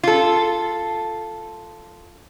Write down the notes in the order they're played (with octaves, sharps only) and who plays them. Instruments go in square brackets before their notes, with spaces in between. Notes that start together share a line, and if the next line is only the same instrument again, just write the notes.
[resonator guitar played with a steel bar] F4 A4